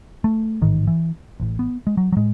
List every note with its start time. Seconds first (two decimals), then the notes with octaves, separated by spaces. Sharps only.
0.24 A3
0.62 A1 G#2 D#3
0.87 E3
1.40 A1 A2
1.59 B3
1.87 G#3
1.97 F#3
2.12 F#3
2.17 A2 G#3